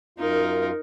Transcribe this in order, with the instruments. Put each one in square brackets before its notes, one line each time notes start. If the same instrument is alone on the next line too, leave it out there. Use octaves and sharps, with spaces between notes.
[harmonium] F#2 F4 [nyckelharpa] D#4 A#4